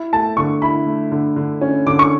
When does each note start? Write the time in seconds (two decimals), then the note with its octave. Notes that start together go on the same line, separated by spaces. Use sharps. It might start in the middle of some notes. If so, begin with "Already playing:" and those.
Already playing: E4
0.12 A3 A5
0.37 D3 C#6
0.62 E4 B5
0.86 A3
1.12 D3
1.36 D3
1.61 C#4
1.87 D3 D6
1.99 C#6